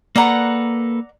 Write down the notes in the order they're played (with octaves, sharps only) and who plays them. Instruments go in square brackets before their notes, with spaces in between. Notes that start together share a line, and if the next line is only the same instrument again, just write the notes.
[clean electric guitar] A#3 A4 B4 [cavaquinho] D5 F#5 A#5